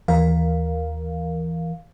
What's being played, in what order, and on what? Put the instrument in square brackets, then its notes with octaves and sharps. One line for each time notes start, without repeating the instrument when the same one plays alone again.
[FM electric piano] D#2 E3 A#4 F5